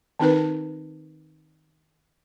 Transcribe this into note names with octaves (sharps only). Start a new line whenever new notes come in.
D#3 C4 D#4 A#4 B4